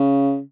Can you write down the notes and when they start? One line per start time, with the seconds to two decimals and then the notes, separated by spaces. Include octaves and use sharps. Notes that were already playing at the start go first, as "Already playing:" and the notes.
Already playing: C#3